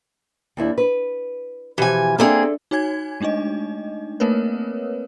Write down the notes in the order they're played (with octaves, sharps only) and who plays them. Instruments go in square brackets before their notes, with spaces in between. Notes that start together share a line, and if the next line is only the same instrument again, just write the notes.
[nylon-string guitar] D#2 D4 E4
B4
[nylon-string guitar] B2 F3 G4 [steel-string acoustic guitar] E3 G#5
[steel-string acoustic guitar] A#3 C4 G#4 [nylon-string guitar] D4 A4 E5
[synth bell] D#4 F#4 C#5 G#5 G#6
G#3 A3 D4 D#4 D#5
A3 A#3 C4 A#4 B4 C#5